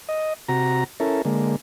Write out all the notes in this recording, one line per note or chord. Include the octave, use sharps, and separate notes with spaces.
D#5
C3 F#4 A#5
C#4 E4 A4 A#4
D3 G#3 A#3